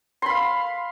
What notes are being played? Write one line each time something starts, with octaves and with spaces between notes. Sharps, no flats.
F5 B5 C6